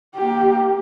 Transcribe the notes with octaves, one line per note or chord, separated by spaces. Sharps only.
A#3 G4